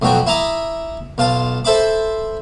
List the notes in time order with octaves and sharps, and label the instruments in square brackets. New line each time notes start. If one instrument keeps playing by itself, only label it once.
[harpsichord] B1 F2 F#3 F#4 G5
E4 E5 A#5 D6 D#6
B1 F4 A5
A4 C5 E5 B5 D6